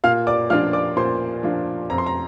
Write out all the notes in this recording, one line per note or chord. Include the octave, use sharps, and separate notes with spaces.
A#2 F5 F6
D5 D6
F3 D4 F4 F5 F6
D5 D6
A#2 C5 C6
F3 D4 F4
F2 A#5
C6
A#5